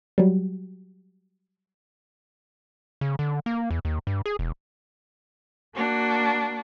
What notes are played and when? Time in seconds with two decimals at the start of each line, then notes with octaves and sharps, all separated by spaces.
0.18 F#3 G3
3.01 C#3
3.19 D3
3.46 A#3
3.71 E2
3.85 D#2
4.07 G2
4.26 G#4
4.39 E1
5.75 A#3 D4 F#4